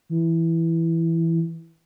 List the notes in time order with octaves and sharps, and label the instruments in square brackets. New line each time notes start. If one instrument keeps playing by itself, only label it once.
[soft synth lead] E3